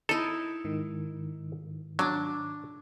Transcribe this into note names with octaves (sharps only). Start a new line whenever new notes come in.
D#4 E4 A4
G#2 D#3
F#3 D4